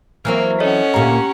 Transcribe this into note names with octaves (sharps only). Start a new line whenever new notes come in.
E3 F#3 A#3 C4 F6
C#4 A4 C#5 D#5 F#5
D2 A#2 A#3 G4 A#5